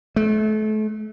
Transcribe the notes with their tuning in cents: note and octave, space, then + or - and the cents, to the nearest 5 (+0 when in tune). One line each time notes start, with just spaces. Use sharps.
A3 -35